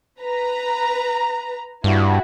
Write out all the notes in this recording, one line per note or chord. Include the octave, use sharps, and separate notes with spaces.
B4 A#5
G2 E4 F#4